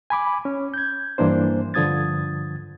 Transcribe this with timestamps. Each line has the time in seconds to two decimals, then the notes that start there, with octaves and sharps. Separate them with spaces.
0.10 G#5 B5 D6
0.45 C#4
0.74 G6 G#6
1.18 G2 E3 A#3 D4 C5
1.74 G2 D3 F3 D#6 G#6 A6